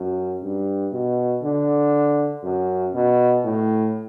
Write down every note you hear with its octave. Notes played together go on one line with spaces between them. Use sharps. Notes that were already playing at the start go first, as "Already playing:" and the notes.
Already playing: F#2
G2
B2
D3
F#2
B2
A2